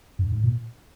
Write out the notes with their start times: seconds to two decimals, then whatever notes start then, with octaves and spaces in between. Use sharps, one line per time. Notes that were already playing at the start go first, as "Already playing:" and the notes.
0.19 G2
0.32 G#2
0.44 A#2